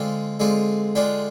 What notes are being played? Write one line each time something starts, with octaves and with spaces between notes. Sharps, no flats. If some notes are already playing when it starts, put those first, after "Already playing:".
Already playing: D3 G#3 C4 F4 G5
D3 G#3 C4 F4
D3 G#3 D4 F4 G5